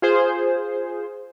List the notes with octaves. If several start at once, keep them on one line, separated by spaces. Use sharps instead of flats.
F4 G#4 C5